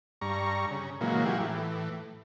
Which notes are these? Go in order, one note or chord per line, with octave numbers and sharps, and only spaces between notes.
G2 A#5 C#6
C#3
A#2 C#3 E3 F#3 G#3 A#3
E4 F4 G4 F#5 G#5
A2 E3